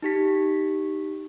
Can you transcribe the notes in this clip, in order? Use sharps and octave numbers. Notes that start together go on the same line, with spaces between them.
D#4 G4 B6